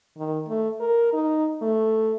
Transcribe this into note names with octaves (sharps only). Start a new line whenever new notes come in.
D#3
A3
A#4
D#4
A3